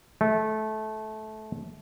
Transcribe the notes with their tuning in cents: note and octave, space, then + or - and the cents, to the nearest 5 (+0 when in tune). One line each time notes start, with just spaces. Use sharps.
A3 -20